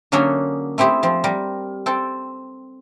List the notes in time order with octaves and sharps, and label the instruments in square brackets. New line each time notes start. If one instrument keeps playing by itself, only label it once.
[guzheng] D3 F#3 A#3 C#4 D4 G#4
A3 C4 E4 G4 G#4
F3 C4
G3 A#4
C4 A4 G5